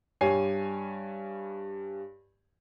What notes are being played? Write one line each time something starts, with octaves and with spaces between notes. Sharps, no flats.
G2 G3 C#5 G#5 C7